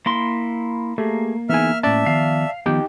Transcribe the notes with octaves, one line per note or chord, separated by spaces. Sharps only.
A#3 E4 C6
A3 A#3 G4 G#4
E3 B3 D#4 G#4 E5 G#5 F6
A2 C#4 D5 E5 A5
D#3 F3 B3 F5
D#3 F3 B3 D#4 G4 G5